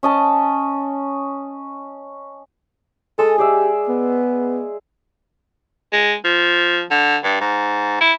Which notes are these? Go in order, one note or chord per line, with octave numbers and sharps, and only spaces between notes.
C#4 D#5 A5
G#3 A4 D#6
G4 G#4 D5 E5
B3
G#3
F3
D3
G2
G#2
E4